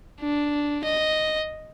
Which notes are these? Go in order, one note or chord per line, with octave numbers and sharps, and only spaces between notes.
D4
D#5